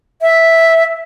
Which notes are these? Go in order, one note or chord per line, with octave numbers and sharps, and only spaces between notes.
E5